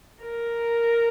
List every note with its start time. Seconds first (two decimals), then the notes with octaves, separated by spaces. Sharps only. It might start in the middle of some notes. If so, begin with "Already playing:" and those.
0.21 A#4